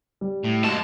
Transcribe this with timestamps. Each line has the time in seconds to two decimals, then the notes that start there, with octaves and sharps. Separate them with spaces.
0.21 G3
0.45 A2
0.64 F#2 F#3 G#3 A#3 A5